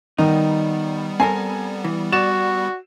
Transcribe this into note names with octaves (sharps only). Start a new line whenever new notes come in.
D#3 G3 B3 D#4
C4 A4 A#4 G#5
E3
F#4 D5 E7